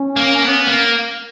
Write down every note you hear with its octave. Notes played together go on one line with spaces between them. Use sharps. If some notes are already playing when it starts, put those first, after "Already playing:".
Already playing: C#4
A#3
B3
A#3